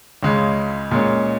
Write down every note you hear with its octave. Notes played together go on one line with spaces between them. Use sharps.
C#2 C#3 G#3
A#2 G#3 C#4